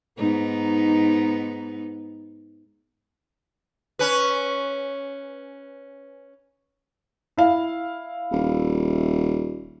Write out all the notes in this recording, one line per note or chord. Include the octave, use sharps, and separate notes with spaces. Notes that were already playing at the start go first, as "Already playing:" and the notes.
G#2 B3 D#4
C#4 B4
E4 F5
D#1